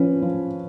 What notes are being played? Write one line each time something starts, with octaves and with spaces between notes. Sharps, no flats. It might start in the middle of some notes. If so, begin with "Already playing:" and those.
Already playing: F3 C#4 B4
F3